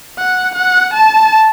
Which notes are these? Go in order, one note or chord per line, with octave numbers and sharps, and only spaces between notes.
F#5
F#5
A5